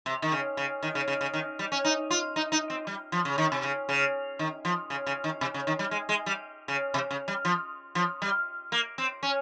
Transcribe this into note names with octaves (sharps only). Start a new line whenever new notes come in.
C3
D#3
C#3
C#3
D#3
C#3
C#3
C#3
D#3
G3
C#4
D#4
F4
D#4
D#4
C4
G3
F3
C#3
D#3
C3
C#3
C#3
D#3
F3
C#3
C#3
D#3
C3
C#3
D#3
G3
G#3
G#3
G3
C#3
C3
C#3
G3
F3
F3
G3
A#3
C4
C#4